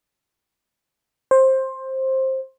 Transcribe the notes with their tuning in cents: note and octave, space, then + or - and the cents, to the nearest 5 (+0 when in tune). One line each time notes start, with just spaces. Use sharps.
C5 +15